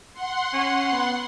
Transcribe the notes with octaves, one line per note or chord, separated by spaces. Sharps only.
F#5 C6
C#4
B3